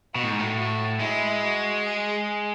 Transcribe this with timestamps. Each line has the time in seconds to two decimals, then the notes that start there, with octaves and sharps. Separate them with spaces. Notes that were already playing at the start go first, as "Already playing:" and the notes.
0.15 B2 F#4
0.24 A2
0.31 G#2
0.40 A2
0.57 F#4
0.99 G#3 E4
1.42 F#4
1.84 G#4